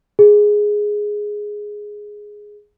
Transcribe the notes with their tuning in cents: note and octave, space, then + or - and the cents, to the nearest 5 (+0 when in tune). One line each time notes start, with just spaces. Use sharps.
G#4 +0